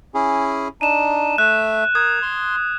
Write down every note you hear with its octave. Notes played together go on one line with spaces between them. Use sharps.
C#4 E4 G#4
D4 D#4 D#7 E7
A3 E5 F#6
A#4 D#6 G#6
C6